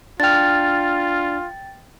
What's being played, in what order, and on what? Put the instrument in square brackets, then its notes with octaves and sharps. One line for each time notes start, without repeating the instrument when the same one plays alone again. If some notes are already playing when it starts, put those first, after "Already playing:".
[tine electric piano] D4 F6 [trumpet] F4 [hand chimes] G5 A6